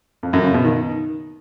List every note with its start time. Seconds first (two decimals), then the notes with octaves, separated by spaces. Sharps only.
0.23 F2
0.33 F#2
0.44 C#3
0.54 B2
0.65 D#3